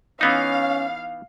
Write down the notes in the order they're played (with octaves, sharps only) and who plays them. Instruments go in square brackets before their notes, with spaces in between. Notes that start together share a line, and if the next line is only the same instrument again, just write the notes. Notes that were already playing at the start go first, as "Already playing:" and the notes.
[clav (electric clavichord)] E3 B3 D#4 [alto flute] C#4 [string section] F5